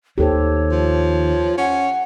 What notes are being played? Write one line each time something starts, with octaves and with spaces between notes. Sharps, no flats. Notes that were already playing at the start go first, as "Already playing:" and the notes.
D#2 D#3 G4 A4 C5 C#5
F3
C#4 F#5